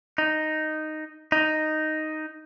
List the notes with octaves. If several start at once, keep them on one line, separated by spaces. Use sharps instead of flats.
D#4
D#4